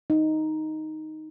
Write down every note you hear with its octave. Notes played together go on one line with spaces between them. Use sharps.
D#4